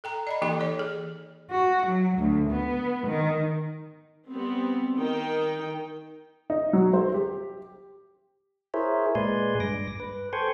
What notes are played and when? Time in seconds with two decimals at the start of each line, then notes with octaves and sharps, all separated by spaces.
0.04 A4 G5 A#5
0.27 D5 D#5 B5
0.42 E3 A#3 D#4 G4 A4 G5
0.58 E3 A4 C#5
0.79 G#4
1.51 F#4
1.87 F#3
2.19 D2
2.50 B3
3.08 D#3
4.28 G3 B3 C4
4.97 D#3 D#4 G5
6.50 D#4
6.73 F#3
6.93 C5
7.14 G4
8.74 E4 G#4 A#4 C5 C#5 E5
9.15 A#2 G#3 B4 D5 G#5 C6
9.60 G2 D6 A#6
10.00 B4
10.33 A4 C5 G5 G#5 C6 C#6